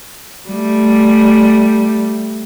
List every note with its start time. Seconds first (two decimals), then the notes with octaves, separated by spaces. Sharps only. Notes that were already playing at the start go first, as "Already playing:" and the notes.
0.49 G3 A3